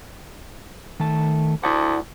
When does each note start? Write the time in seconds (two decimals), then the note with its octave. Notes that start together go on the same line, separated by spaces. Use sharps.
1.00 D#3 A3 A5
1.63 D2 E4 D5 F#5